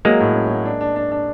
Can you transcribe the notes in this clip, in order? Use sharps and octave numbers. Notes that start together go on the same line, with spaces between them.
F#3 G#3 A#3
A2
C#4
F#3
D4
D4
D4
D4